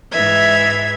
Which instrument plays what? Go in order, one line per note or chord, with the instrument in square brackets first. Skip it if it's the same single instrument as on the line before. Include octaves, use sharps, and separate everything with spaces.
[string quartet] G#2 E3 E5 G#6